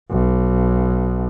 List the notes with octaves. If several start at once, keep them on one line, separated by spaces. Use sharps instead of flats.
B1